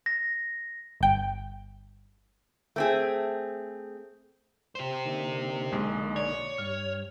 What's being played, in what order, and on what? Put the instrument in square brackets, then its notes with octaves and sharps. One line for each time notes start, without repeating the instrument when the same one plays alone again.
[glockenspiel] A#6
[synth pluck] G1 G5
[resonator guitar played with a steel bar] A3 C4 G#4
[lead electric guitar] G4 C5
[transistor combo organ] D3 A#3 D#4
[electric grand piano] B1 G#3
[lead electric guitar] C#5 [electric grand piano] D5
[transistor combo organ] G2 [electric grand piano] F6